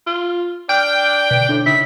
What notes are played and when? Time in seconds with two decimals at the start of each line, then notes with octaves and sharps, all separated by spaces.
0.07 F4
0.69 D4 G5 F6
1.31 B2 D3
1.49 A2 D4
1.66 C#3 D#4 E4 B6